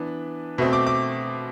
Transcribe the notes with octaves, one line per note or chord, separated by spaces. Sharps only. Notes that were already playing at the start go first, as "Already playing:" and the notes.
Already playing: E3 B3 D4
B2 A3 C4
D6
D6